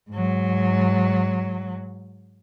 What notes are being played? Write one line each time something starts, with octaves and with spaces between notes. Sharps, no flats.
G#2 F#3